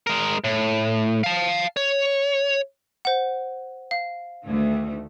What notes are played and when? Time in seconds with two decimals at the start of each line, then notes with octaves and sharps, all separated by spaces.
0.07 G#3 A#4
0.44 A2
1.24 F5 A5
1.77 C#5
3.05 C5 F#5
3.91 F5
4.45 D2 D#3 A3